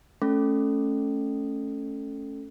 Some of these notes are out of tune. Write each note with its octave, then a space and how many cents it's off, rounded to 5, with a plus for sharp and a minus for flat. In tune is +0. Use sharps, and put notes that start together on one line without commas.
A3 +0 C#4 +0 A4 +0